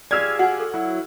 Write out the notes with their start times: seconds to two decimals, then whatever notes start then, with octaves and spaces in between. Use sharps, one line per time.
0.11 F4 G4 G#4 D5 E6 F6 G#6
0.39 F#4 F#5 G#5
0.60 A4
0.74 F#3 E4